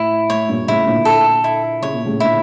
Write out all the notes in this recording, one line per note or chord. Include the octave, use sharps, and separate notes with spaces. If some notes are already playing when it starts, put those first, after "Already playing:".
Already playing: A2 E4
A2 C#5
G2 A#2
A2 C#3 E4
A#2 D3
A4
E4
C#3 C#5
A#2
A2 C#3
A#2 D3 E4